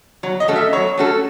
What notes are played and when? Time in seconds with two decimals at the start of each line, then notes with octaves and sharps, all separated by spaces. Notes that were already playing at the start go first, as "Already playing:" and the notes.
0.23 F#3 C#5
0.40 D#5
0.48 A3 C#4 F#4 A4
0.56 E5
0.73 F#3 C#5
0.97 A3 C#4 F#4 A4